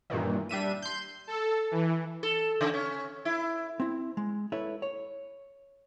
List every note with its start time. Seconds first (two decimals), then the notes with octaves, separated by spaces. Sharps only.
0.10 G2 A#2 D#3 E3
0.49 G3 D4 E5 D#7
0.82 C6 G6
1.27 A4
1.71 E3
2.23 A4
2.61 C#3
2.74 C#4
3.25 E4
3.80 C4 E4
4.17 G#3
4.52 E4 A4 B4 C#5 E5
4.82 C#5